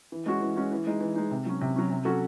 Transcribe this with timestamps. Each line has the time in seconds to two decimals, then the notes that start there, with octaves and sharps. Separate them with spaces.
0.12 E3
0.26 G#3 C#4 F#4
0.41 E3
0.56 G#3 C#4 F#4
0.72 E3
0.87 G#3 D#4
1.01 E3
1.15 G#3 D#4
1.31 C3
1.46 F#3 C#4
1.61 C3
1.76 F#3 C#4
1.90 C3
2.05 F#3 C#4 F#4 A4